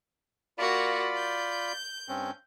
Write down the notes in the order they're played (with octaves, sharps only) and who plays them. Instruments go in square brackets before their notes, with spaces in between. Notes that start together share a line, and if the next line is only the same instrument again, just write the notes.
[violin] A#3 F#4 [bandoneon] F4 D5 B5
[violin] G6
[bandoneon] G2 C4 C#4